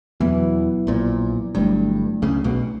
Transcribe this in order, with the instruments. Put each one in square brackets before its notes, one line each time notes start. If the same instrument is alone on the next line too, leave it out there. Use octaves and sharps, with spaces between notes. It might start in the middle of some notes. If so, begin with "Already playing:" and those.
[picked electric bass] E2 E3 [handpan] F#3 B3 E4
[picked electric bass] A#1 A#2
[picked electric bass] G1 G2 [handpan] F#3 A3 D4
[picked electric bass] C#2 C#3
B1 B2